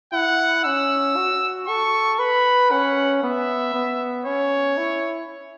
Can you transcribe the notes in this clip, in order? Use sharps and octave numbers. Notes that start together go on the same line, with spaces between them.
E4 F#5
C#4 E6
F#4
A4 C#6
B4 B5
C#4 F#5
B3 E5
B3
C#4 C#5
E4